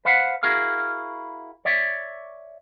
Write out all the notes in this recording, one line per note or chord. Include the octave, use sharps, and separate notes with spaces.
B4 C5 F5 F#5
E4 F#4 G#4 A#4 F5
C#5 D5 E5